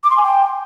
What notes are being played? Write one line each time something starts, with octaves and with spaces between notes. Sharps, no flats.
D6
C6
G#5
G5